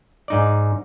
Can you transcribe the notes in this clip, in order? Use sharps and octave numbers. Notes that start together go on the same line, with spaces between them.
G#2 D#4 D5